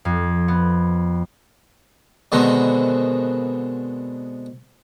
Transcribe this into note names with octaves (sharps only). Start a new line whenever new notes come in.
F2
B3
B2 D3 D#3 G#3 B3 C4